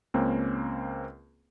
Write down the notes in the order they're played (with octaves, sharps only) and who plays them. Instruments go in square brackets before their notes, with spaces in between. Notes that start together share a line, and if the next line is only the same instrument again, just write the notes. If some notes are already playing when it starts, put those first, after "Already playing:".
[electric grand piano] C#2 A#3 C4 C#4